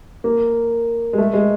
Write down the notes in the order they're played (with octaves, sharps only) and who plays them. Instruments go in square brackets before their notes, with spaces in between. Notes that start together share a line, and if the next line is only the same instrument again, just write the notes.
[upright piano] A#3
G#3
A3
G#3